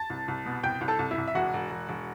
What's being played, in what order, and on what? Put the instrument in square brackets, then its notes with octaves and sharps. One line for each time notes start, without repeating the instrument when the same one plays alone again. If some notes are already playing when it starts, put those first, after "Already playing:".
Already playing: [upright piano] A5 A6
C2
C2
B2
C2 G5 G6
C2
A4 A5
C2
E4 E5
C2
E5
E1 F#4 F#5
E1
E1
E1